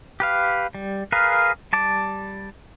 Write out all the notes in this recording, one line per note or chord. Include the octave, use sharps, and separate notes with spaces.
G4 B4 F5
G3
G#4 A#4 B4 F5
G3 A5 D6